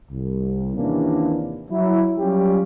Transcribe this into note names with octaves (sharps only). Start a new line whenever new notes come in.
C2
D#2 C3 E3 A#3 C#4 D4
F#3 E4
F#3 G3 C#4 F4 G4